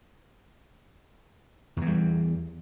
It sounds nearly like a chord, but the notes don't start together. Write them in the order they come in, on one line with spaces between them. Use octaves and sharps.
E2 E3 G3